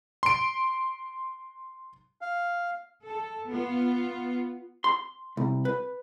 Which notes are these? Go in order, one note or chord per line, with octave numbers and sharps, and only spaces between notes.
C6 D7
F5
A4
B3 F4
C6
C2
B4